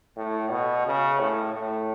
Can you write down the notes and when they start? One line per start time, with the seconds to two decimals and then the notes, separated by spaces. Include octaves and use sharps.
0.17 A2
0.51 B2
0.86 C#3
1.20 A2
1.54 A2